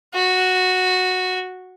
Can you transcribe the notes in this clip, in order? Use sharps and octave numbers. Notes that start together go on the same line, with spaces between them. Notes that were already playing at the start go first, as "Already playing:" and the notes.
F#4